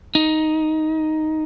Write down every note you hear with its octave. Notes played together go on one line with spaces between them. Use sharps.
D#4